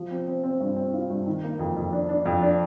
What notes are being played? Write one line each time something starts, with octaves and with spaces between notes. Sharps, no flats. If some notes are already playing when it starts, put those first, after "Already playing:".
Already playing: F3
C4
C4
C4
G2
C4
F4
G2
D#3
A#3
F2
F2
D4
D4
F2
D4